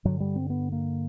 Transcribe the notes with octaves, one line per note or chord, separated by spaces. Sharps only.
G2 D3 F#3
G3
C4
B3
A#3